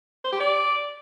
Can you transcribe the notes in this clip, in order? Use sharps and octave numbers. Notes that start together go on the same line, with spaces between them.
C5
G4
D5